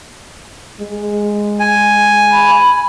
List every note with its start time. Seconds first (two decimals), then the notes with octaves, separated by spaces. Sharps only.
0.80 G#3
1.60 G#5
2.32 B5